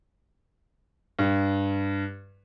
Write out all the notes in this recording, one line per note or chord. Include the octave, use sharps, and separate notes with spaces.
G2